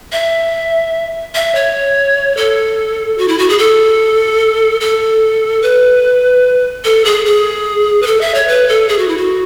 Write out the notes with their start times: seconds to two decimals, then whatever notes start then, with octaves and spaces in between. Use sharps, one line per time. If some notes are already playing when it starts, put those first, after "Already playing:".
0.12 E5
1.35 E5
1.55 C#5
2.37 A4
3.18 F#4
3.28 E4
3.38 F#4
3.49 G#4
3.58 A4
4.81 A4
5.62 B4
6.84 A4
7.05 G#4
7.26 G#4
8.02 B4
8.07 A4
8.21 E5
8.34 C#5
8.48 B4
8.69 A4
8.89 G#4
8.99 F#4
9.08 E4
9.17 F#4